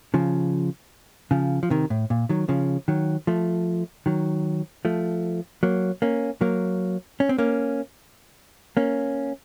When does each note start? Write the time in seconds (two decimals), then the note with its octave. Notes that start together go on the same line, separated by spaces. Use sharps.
0.14 C#3 F3
1.31 C#3 F3
1.63 F3
1.70 C3 D#3
1.90 A2
2.10 A#2
2.29 D#3 F#3
2.49 C#3 F3
2.88 D#3 F#3
3.27 F3 A3
4.06 D#3 F#3
4.85 F3 A3
5.63 F#3 A#3
6.02 A#3 C#4
6.41 F#3 A#3
7.20 C#4
7.29 C4
7.38 A#3 C#4
8.77 A#3 C#4